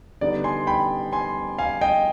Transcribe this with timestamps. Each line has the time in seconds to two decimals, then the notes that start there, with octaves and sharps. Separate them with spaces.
0.21 D3 G3 B3 D#4 D5
0.44 G#5 C6
0.67 G5 B5
1.12 G#5 C6
1.58 F5 G#5
1.81 D#5 G5